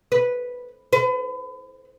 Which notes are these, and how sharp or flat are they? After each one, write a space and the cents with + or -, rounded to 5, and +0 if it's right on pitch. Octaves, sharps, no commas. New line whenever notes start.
B4 -5
B4 +35